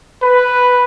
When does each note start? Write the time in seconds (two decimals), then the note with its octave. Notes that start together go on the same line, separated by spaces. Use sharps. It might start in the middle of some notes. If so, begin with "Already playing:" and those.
0.23 B4